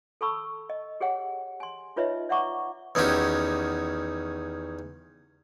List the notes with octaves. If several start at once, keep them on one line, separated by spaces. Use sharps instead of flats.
A4 A5 B5 C#6 E6
D#5
G4 G#4 C#5 F#5 G5
G#5 C6
D#4 F4 B4 C#5 D#5 E5
D5 E5 F#5 A#5 C#6 D6
E2 D#3 C#4 F#4 G4